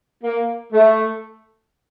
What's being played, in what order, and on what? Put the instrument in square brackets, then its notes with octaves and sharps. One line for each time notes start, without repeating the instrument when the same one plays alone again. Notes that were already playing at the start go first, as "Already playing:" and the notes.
[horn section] A#3
A3